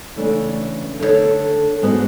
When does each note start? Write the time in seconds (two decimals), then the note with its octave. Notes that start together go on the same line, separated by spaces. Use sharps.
0.16 C#3 E3 A3 D4
0.99 D3 A3 E4 A4 C#5
1.82 G#2 G#3 B3 F#4